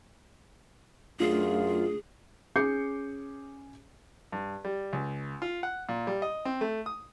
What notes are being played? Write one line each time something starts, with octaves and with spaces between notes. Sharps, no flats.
F#2 A3 D4 F4 G#4
C#4 G#4 D6 G6 C7 C#7
G2
G3
C#2
F4
F#5
A#2
G3
D#5
C4
A3
D#6